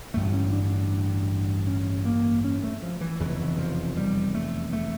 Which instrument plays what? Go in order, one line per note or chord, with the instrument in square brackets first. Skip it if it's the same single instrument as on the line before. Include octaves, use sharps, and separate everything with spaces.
[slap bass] A1 G2 D3 A3
C#4
D4
D4
C#4
A#3
C#4
A3
F3
E3
F1 E2 C#3 E3
F3
G3
A3
A3